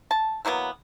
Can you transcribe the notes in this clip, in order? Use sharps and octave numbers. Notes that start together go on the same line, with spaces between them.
A5
E3 F#3 A#3 B3